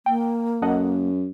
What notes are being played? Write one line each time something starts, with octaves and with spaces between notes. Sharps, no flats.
A#3 G5
F#2 A4 D#5 F#5